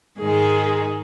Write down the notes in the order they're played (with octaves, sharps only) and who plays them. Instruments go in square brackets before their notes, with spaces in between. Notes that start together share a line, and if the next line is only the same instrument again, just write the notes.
[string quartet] G#2 D#3 G#3 [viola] G#4